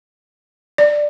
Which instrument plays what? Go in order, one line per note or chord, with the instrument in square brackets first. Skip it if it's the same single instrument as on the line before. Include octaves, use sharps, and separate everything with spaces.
[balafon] D5